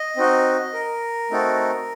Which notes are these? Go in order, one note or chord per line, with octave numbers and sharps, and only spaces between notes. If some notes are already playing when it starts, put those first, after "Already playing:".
Already playing: D#5
C4 D#4 F#4
A#4
A3 C4 D#4 F#4 A4